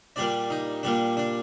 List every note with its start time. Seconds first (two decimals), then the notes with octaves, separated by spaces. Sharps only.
0.16 A#2 G3 D4 D5
0.50 D#4
0.83 A#2 G3 D4
1.17 D4